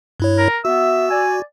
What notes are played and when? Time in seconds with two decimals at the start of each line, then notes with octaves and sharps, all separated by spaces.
0.20 G2 E4 C#5
0.38 A#4
0.65 B3 F#4 E5 E6
1.10 D5 G#5